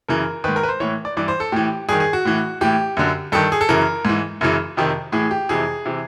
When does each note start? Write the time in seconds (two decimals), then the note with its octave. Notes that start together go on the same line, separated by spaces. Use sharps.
0.08 F#2 C#3 E3 A#4
0.44 G#2 D#3 B4
0.56 A#4
0.63 B4
0.69 C5
0.80 A2 E3 C#5
1.05 D5
1.17 G2 E3 D5
1.28 C5
1.40 A4
1.52 A2 E3 G4
1.89 G2 D#3 G#4
2.00 G#4
2.13 F#4
2.25 A2 E3
2.61 A2 E3 G4
2.97 F#2 D3
3.32 G2 D#3 A4
3.52 G#4
3.61 A4
3.69 F#2 C#3 E3 A#4
4.05 G#2 E3
4.41 F#2 C#3 E3
4.77 F2 C3 D#3
5.12 A2 E3 G#4
5.31 G4
5.49 F2 C3 E3 G#4
5.86 C3 E3